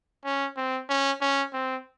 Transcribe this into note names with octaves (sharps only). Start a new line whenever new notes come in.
C#4
C4
C#4
C#4
C4